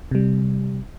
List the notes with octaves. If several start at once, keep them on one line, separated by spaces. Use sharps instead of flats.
C3 G3